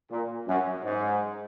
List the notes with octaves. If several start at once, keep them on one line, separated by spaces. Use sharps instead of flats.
A#2
F#2
G#2